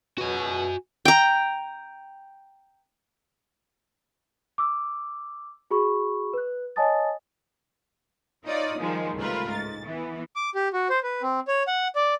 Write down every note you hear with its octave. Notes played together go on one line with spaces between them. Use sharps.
C#2 B2 F#4 G#5
G5 A#5
D6 E6
F#4 G#4 B5 C#6
B4 F#6
C#5 D#5 G#5 A5 D#6 A6
D#4 F4 C#5 D5 D#6
D#3 F3 G3 G#3
C#2 C3 A3 F4 A#4 B4
G#2 A6
E3 B3
D6
G4
F#4
C5
B4
C4
C#5
F#5
D5